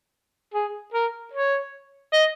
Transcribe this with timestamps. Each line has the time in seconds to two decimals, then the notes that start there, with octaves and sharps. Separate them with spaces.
0.54 G#4
0.94 A#4
1.33 C#5
2.13 D#5